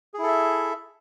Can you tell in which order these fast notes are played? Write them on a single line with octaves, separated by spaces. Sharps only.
G#4 E4 A4 E5